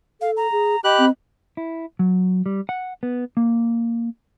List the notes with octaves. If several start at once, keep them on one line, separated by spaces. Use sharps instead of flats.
A4 F5
A#5
G#4
G4 D#5 B5 F#6
C4
E4
F#3
G3
F#5
B3
A#3